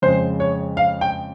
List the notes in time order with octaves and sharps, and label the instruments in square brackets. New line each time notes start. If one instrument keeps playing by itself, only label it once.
[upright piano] F2 C#3 G#3 C5
C#5
F5
G5